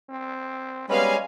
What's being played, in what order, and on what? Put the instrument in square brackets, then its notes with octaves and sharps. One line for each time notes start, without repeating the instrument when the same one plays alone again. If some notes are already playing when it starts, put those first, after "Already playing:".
[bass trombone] C4
[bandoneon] G3 G#3 C#4 [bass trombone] B3 [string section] B4 F5 G#5